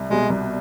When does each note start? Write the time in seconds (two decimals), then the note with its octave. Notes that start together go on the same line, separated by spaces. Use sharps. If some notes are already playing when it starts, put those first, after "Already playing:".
Already playing: C2
0.10 B2 G3 G#3
0.30 C2